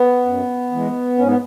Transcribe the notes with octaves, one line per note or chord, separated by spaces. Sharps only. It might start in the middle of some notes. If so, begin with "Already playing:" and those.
Already playing: B3
F#2
E3 G#3
G#2 C#4
B3